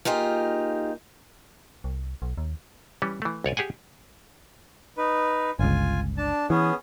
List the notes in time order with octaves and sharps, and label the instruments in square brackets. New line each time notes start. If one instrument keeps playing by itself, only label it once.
[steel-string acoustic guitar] A#3 D#4 F4 G4 G#4
[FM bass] C2
B1
D#2
[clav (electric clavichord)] E3 G3 C#4
E3 A3
C2 C#5 D5 G#5
G4 G#4 F#5 G#5
[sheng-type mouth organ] D#4 B4
[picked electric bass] G1 C#2 [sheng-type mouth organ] F4 G#5
[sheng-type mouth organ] D4 A5
[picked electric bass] E3 [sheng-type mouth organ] B3 C#4 G#4